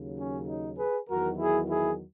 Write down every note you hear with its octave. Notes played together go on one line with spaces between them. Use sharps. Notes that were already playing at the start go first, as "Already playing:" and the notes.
Already playing: D#2 C#3 F#3
C#4
D#4
G#4 B4
E2 D#3 F#3 F#4 A#4
E4 G#4
E4 G#4